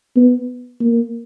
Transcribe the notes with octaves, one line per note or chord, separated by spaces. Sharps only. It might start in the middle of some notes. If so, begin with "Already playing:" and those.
B3
A#3